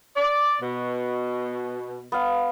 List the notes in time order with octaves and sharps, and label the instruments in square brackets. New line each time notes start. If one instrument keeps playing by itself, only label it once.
[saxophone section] D5
B2
[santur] B3 F5